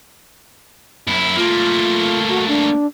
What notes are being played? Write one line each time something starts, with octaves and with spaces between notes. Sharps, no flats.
F#2 E4
A3 A#3 F4
F#4
D4